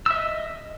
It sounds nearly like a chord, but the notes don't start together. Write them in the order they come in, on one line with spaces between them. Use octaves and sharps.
E6 E5 D#5